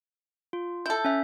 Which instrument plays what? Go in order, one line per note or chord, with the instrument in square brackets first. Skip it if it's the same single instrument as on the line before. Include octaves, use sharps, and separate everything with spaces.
[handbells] F4
[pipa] E4 A4 [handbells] G6
[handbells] C#4 E5